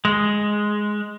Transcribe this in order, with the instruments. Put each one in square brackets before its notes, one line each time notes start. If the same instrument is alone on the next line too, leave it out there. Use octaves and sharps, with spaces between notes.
[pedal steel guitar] G#3